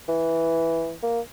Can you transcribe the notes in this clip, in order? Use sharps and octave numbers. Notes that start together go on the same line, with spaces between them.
E3
A#3